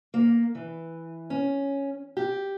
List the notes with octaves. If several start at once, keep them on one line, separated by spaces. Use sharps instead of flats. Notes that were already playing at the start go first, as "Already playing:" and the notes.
A#3
E3
C#4
G4